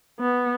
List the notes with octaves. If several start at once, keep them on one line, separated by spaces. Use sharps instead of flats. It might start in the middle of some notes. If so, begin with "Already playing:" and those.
B3